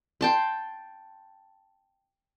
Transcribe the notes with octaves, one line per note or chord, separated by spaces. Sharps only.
G5 A5 C6